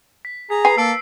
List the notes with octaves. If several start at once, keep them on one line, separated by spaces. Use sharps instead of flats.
B6
G#4 A#5 B6
B4 G#5 C7
A#3 A4 E6 D7